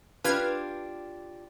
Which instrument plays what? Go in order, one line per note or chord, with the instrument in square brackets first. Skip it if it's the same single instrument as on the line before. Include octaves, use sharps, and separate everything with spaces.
[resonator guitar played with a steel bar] D4 F4 G4 [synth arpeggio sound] B4 F6 G#6